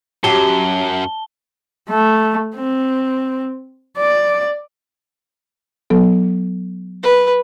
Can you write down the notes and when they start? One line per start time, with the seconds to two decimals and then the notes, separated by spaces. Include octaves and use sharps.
0.24 F#2 F#3 G4 A5 G7
1.89 A3
2.55 C4
3.97 D5
5.90 F#3 B3 A4
7.03 B4